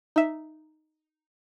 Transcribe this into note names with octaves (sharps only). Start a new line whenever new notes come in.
D#4 E5